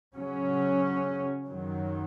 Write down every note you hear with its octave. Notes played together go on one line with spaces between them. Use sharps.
C#3 F#3 C#4
F#2 D#3 F#3